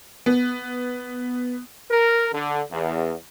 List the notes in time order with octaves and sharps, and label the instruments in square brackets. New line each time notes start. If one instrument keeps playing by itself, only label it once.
[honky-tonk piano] B3
[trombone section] A#4
D3
E2